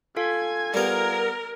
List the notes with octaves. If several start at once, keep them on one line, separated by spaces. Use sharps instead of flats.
F4 A4 F5 G#5 G#6
G3 B3 A#4